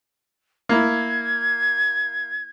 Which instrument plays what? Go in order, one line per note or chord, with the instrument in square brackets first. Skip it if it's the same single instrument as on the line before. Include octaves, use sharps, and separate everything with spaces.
[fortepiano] A#3 E4 [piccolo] G#6